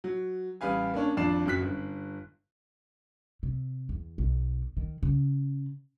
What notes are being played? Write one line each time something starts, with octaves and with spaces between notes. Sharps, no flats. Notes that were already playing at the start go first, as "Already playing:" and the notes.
F#3
A1 G3 B4 F5 G#5
A#3 C#4 D4 C#5
G#1 F2 D4 D5 C7 E7
F#1 F#3 F#6 B6
G1
C3
E2
B1
D#3
C#3